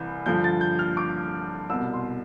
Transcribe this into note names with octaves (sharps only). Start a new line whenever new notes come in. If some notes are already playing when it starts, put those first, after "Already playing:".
Already playing: C2 E3 G6
G2 D3 F3 G6
A6
G6
F6
D6
C2 B2 E6
C6